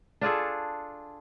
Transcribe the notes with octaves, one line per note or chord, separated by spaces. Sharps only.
D4 F4 G#4 A4